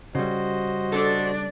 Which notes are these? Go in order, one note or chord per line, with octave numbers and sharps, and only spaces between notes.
C#3 G3 F#4 C5 D#5
D4 A4 D5